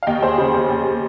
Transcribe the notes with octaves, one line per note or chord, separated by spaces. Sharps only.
F5
D#2 D#5 G5
D#2 G#4 C5
C#3
D#2
D#2